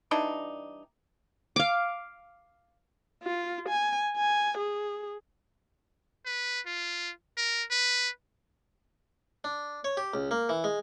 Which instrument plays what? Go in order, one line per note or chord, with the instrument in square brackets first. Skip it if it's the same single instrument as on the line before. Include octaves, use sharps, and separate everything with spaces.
[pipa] E3 G3 D4 D#4
[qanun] F5 D6
[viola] F4
G#5
G#5
G#4
[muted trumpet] B4
F4
A#4
B4
[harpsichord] D4
C#5
G4
C#2
A#3
E3
G#3